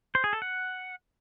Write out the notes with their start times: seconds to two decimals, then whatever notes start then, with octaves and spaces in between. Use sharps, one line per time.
0.15 C5
0.24 G#4
0.33 A4
0.42 F#5